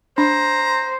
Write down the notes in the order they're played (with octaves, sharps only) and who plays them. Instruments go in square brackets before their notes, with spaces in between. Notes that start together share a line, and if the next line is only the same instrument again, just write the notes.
[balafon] D4 [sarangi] C5 [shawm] A#5